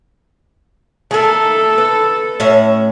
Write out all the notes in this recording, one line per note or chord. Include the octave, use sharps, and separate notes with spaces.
A3 A4 A#4
B4
A2 C#4 E5